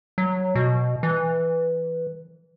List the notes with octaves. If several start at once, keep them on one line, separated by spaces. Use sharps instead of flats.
F#3
B2
E3